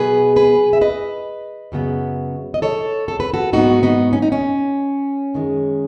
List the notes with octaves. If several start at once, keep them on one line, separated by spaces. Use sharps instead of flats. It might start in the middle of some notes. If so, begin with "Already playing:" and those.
Already playing: B2 F#3 B3 G#4 B4
G#4 B4
E5
B4 D#5
F#2 C#3 F#3 B3
D#5
A4 C#5
A4
B4
F#4 A4
G#2 F#3 B3 D#4 F#4
B3 D#4
C#4
D#4
C#4
F#2 D#3 G#3